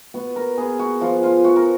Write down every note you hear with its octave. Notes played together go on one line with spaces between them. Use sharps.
B3 F#4
A#4
B3 G#4
F#4
F3 F4
F4
F3 F#4
A#4